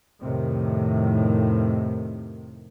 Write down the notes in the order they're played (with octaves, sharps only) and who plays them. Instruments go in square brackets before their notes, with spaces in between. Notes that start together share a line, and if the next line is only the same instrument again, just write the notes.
[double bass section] F2 A2 C3 D#3